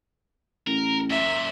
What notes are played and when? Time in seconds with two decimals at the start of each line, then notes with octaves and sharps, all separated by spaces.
0.67 A1 A#4
1.10 F#2 A#2 E5